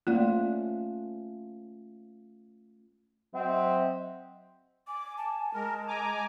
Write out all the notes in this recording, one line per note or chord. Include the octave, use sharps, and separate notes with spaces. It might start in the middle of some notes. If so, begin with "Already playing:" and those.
A3 A#3 C#4 F4 D5 F#5
F#3 C4 D#5 E5 F#5
G#5 D6
A5
G#3 A#4
G#5 A#5 D6